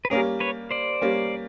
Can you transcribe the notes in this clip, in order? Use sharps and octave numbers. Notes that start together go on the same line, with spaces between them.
B4
G3 A#3 C#4 G#4 A#4
B4 C#5
C5 D5
G3 A#3 C#4